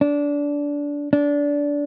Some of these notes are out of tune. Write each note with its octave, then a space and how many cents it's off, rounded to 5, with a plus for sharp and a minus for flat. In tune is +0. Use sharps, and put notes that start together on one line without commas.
D4 -20
D4 -20